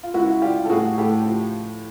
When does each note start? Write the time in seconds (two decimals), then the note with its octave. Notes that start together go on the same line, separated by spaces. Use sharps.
0.03 F4
0.14 C#2 E4 F#4
0.41 G3 F4 G4
0.65 A4
0.70 A2 F#4 G#4
0.98 A2 G4 A4
1.26 F3